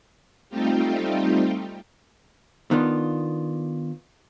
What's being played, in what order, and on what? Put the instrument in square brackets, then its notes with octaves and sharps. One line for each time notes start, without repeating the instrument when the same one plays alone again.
[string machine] G3 A3 C4 D#4 F4 G4
[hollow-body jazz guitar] D#3 B3 D4 F4